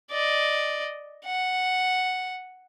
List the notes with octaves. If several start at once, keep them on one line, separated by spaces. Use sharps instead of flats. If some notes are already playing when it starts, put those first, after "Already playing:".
D5 D#5
F#5